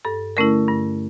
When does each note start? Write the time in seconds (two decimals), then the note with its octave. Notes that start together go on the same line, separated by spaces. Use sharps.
0.05 G2 A4
0.37 D3 A3 C#4 E4 A#4
0.68 G2